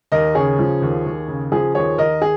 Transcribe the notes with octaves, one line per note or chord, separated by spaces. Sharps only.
D#2 A#4 D#5
C#3 G#4 C#5
F3
D#2
D#2
C#3
F3 G#4
D#2 G#4 C#5
D#2 A#4 D#5
G#4